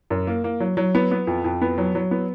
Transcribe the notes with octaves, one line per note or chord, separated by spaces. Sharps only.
F#2
A#3
A#3
F#3
F#3
B3
B3
F2
F2
B3
F#3
F#3
B3